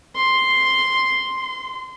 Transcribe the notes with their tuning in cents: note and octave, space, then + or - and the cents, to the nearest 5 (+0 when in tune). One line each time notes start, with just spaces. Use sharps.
C6 +0
C6 -25